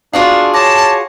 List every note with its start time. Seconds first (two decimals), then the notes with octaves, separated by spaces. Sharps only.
0.13 D4 F4 F#4 G#4 F5
0.54 C#5 A5 D6 A#6